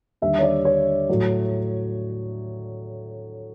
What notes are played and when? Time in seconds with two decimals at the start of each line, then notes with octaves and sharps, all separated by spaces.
0.22 D#2 D3 G3 E5
0.39 C#5
0.43 D5
0.65 C#5
1.09 A2 F#3